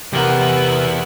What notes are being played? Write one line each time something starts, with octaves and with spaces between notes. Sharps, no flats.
E2 C3 B3 E4 G4 A#4 F#5